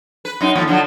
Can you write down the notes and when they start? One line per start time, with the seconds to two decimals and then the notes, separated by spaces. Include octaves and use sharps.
0.25 B4
0.41 F#2 D#4
0.55 D#2 A2 F3
0.68 D3 F3 F#3